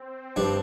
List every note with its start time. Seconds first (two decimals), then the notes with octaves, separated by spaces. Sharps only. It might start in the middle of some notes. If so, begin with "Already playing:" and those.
Already playing: C4
0.36 G2 F3 D4